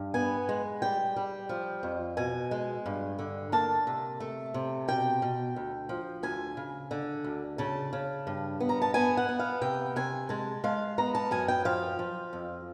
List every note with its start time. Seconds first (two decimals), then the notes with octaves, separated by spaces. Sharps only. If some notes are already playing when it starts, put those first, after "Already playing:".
Already playing: G2
0.14 B3 G#5
0.49 G#3
0.82 G3 G5
1.16 G3
1.49 F3
1.83 F2
2.17 B2 G#5
2.51 G#3
2.86 G2
3.19 D3
3.52 A#3 A5
3.87 C3
4.20 A3
4.54 C3
4.88 B2 G5
5.22 B2
5.56 D2
5.89 F3
6.23 D2 G#5
6.57 C#3
6.91 D3
7.24 D2
7.58 C#3 A5
7.93 C#3
8.27 G2
8.60 B3
8.69 A#5
8.82 A5
8.94 B3 G#5
9.17 F#5
9.29 B3
9.40 F5
9.61 C3 G5
9.96 C3 G#5
10.29 G#3 A5
10.64 G#3 F5
10.98 B3 A#5
11.15 A5
11.31 F#2 G#5
11.48 G5
11.65 F3 F5
11.99 F3
12.33 F2